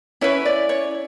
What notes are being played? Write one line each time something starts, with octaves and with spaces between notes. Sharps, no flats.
C#4 E4 B4 C#5
D5
C#5